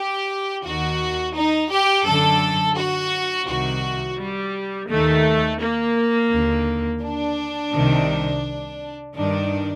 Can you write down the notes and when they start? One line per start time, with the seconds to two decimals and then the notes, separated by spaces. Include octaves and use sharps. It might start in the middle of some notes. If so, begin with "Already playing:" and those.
Already playing: G4
0.64 D#2 D#3 F#4
1.34 D#4
1.70 G4
2.05 F#2 D3 A4
2.76 F#4
3.47 C2 C3 D#3 F#4
4.19 G3
4.89 D#2 D#3 A3
5.61 A#3
6.32 D#2 D3
7.02 D4
7.74 C2 C3 D#3
9.15 G2 D#3 D4